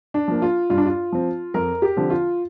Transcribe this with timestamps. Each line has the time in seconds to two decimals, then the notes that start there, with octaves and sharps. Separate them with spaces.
0.14 D4
0.28 F3 A#3
0.42 F4
0.70 G2 F4
0.78 D4
0.86 F4
1.12 F3 C4
1.54 F2 A#4
1.82 G4
1.97 D3 F3 C4
2.10 F4